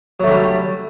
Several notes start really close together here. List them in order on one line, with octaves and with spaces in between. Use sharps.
F#3 A3 D3 G3